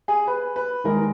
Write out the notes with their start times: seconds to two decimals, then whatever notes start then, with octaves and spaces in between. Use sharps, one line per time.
0.08 G#4
0.27 B4
0.56 B4
0.84 D#2 D#3 G#3 A#4